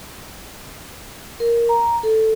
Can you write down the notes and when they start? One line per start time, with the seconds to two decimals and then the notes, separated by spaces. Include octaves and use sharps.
1.40 A#4
1.69 A#5
2.03 A4